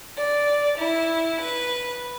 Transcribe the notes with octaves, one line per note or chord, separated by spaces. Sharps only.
D5
E4
B4